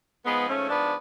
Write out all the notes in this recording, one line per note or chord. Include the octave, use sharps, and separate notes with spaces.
G#2 F3 G#3 B3
A3 C#4
B3 D4